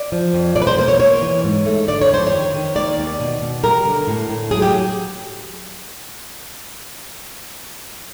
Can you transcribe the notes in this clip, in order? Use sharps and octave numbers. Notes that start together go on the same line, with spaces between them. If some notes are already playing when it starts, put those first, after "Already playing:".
Already playing: D5
F3
F2
B2 D5
B4
C5
A#3 C5
C#5
A#3 C#5
E3
G#2
A3
D3 D5
C#5
F2 C5
D#3 C#5
D#3
A#3 D5
D#2
B2
B2
G3 A#4
D3
A2
A2
F#3 G#4
G4